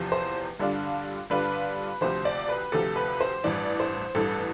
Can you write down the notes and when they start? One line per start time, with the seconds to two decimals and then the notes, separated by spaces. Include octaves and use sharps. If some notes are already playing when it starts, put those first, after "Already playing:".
Already playing: E2 C3 F3
0.12 C5
0.60 G2 D3 G3 D4 F4
1.30 G2 D3 G3 D4 F4 B4
2.01 D2 C3 F3 C5
2.25 D5
2.49 B4
2.72 D2 C3 F3 A4
2.96 B4
3.21 C5
3.44 A1 G2 E3 D5
3.80 C5
4.15 A1 G2 E3 A4